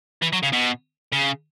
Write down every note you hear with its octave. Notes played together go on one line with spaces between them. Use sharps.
E3
F#3
C#3
B2
C#3